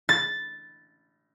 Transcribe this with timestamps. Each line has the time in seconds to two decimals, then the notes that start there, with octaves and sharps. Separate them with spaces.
0.09 A6